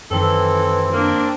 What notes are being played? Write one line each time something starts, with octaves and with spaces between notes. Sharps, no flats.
F#2 D#3 E3 C4 A4
A#3 D4